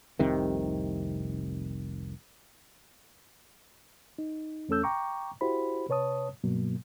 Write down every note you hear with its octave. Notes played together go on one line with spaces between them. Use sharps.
F1 C2 C3 D#3
D#4
E2 A3 C#4 A4 E6 G6
G5 A#5 C#6 D6
E4 F#4 G4 C5 B5
C3 B4 C#5 A5 D#6
G2 B2 F#3 A#3